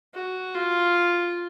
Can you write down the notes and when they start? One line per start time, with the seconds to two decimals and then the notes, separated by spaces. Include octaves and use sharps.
0.14 F#4
0.54 F4